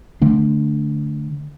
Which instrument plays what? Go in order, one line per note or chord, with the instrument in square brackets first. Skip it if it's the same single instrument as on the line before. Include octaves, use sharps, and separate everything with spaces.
[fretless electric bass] D3 A3 D4